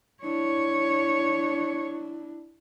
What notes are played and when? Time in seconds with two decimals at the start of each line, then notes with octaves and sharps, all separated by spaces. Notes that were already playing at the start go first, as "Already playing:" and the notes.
0.23 D4 E4 C#5